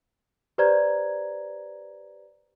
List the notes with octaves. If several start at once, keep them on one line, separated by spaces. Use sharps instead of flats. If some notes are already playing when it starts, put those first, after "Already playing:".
G4 B4 C5 D5 A#5 G#6